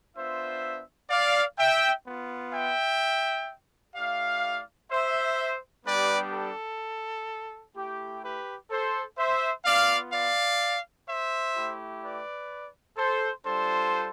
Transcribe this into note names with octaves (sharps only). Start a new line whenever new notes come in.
B3 D4 F4 C5 E5
D5 F5
E5 G5
B3 F4
E5 G5
A3 E4 G4 D5 F5
C5 E5
G3 B3 D4 G4 B4 D5
A4
A3 E4 G4
G4 B4
A4 C5
C5 E5
B3 F4 D5 F5
D5 F5
C5 E5
A3 E4 G4
B4 D5
A4 C5
G3 D4 F4 A4 C5